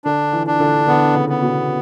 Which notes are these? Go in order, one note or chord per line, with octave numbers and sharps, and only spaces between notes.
D3 D4
E3
D4
D3
D3 B3
C#3
B3
B2